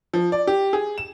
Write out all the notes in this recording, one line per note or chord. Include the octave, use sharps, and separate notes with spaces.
F3
D5
G4
G#4
E7